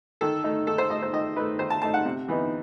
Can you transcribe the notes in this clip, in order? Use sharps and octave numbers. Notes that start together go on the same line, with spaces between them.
D#3 A4
A3 D#4
D#3 A4
C5
A3 D#4 D#5
C5
D#3 D#5
A3 D#4 B4
D#3 C5
A5
A3 D#4 A5
F#5
C3
E3 B3 D#4